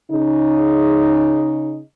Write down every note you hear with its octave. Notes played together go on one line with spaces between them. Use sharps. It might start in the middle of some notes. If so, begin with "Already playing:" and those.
C#3 D#4